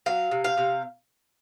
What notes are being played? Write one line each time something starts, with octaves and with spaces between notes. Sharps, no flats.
F#3 F5
C3
F5
C3